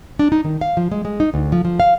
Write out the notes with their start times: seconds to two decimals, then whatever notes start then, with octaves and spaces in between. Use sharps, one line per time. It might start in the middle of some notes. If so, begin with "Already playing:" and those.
0.19 D4
0.32 D#4
0.44 D#3
0.61 F5
0.77 F3
0.92 G#3
1.05 G#3
1.20 D#4
1.34 D2
1.52 F3
1.65 F3
1.80 F5